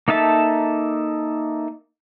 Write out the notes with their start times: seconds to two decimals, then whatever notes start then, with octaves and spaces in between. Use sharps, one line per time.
0.08 A#3 D#4 A4 E5 A5